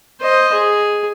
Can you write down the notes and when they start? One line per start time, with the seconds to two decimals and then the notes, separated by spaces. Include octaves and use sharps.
0.21 C5 D#5
0.53 G#4